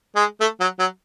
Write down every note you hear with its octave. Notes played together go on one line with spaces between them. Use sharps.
G#3
A3
F#3
F#3